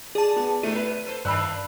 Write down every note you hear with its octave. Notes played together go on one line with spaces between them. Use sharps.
G#4 D5 A5
B3
B2 A3 B3 E4 D#7
B4
A4 C5
G2 D3 D#3 D4 B5 E6 F#6